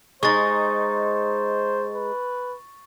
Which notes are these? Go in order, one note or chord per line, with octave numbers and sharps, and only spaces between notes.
G#3 D#4 C5 C#6 A6
B4